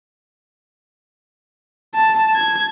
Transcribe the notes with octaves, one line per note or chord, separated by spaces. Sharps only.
A5
G#6